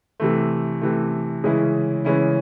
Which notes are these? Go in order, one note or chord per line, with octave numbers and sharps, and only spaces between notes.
C3 E3 A3
C3 E3 A3
C#3 E3 G#3 C#4 E4
C#3 E3 G#3 C#4 E4